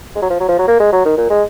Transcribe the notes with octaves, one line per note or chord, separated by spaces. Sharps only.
G#3
F#3
F3
F#3
F3
F#3
A#3
G#3
F#3
D#3
A#2
G#3